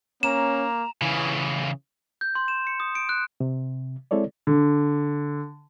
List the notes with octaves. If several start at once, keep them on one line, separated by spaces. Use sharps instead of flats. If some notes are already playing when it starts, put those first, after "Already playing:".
A#3 C#4 A#5 E7
C#3 E3
G6
C6
E7
C#7
D#6
D7
F#6
C3
G#3 C4 E4 A4 C#5 D5
D3